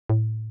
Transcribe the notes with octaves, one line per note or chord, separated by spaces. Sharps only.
A2